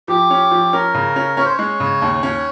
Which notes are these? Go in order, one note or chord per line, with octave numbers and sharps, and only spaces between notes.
F3 G4
C#4
F3
C#4 A#4
C#3
C#4
C#4 C#5
C5
C#5
G#3
C#3
D#2
C#4